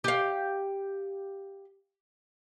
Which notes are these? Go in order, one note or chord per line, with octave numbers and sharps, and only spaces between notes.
G4 F5